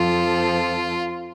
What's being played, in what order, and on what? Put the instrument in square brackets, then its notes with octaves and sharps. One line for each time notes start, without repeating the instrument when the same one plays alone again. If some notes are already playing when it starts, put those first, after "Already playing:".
Already playing: [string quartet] F2 F3 C4 A4 [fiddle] F4